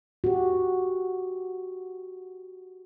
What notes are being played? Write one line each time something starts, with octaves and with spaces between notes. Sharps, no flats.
F#4 G4